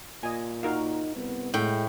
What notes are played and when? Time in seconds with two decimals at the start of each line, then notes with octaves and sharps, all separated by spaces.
0.23 A#2 D#5 G#5
0.63 D#4 F#4 A#4 F5
1.15 C2 B3
1.54 A2 G#3 G5